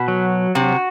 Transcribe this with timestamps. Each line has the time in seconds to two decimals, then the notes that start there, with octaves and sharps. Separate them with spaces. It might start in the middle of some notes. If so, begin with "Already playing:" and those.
Already playing: B2 B4
0.08 F#3
0.55 C3 F#4